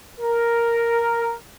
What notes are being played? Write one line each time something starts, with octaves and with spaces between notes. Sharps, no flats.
A#4